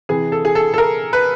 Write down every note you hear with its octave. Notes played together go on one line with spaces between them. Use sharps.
C3 E3 G#4
A4
G#4
A4
A4
A#4
B4